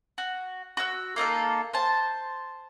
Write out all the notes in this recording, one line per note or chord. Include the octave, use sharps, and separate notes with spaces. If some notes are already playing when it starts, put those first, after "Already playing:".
F#4
F#4 E6
A#3 D#4 F4 A4
C5 A5